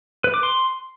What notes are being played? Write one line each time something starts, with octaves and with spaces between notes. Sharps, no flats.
B4
D6
C6